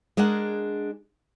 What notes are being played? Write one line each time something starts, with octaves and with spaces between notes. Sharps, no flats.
G#3 D4 G#4 A#4 F#5